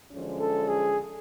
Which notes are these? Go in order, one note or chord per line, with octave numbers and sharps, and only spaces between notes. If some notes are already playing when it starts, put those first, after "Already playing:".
F#2 D3 F3 G#3 C#4
A4
G#4